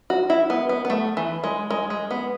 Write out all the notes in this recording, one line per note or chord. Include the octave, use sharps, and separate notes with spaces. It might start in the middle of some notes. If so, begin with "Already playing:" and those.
F#4
E4
B3
B3
B3
A3
E3
G#3
G#3
G#3
B3